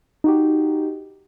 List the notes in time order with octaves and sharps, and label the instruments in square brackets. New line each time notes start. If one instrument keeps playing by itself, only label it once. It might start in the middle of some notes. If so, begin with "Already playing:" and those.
[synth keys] D#4 F#4 G4